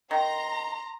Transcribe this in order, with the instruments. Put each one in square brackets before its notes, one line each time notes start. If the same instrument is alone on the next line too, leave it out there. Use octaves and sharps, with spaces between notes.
[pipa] D#3 [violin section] A#5 [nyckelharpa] C6